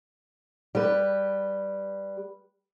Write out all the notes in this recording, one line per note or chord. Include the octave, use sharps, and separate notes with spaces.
G3 G4 B4